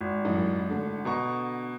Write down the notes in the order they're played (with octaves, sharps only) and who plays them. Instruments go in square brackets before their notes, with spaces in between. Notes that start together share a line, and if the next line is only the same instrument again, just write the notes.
[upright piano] G#1
[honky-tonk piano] A1 F#2
D3 A3
[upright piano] B2 A#5 C#6